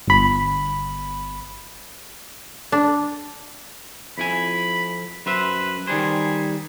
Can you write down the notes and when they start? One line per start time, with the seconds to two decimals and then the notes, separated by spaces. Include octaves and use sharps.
0.08 G1 B5
2.72 D4
4.18 F2 E4 G#5 B5
5.26 F#2 B4 C5 E5
5.87 D#3 G3 G#4 C5